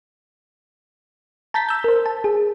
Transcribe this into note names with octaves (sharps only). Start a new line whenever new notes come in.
A5 A#5 G6 A6 B6
E6 G6
A#4 C5
A5
G#4